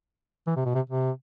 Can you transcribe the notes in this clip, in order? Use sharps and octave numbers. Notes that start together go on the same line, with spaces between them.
E3
C3
B2
C3
C3